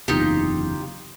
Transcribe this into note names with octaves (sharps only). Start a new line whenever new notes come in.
F#1 E2 C3 D#4 F4 G4